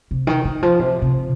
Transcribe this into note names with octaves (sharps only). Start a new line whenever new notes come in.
C3
D#3
D#3
F3
C3
C3